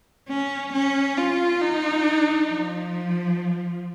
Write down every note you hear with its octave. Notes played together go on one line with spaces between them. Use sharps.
C#4
C#4
F4
D#4
F3